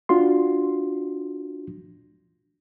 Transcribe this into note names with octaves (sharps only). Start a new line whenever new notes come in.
D4 F4 F#4 C6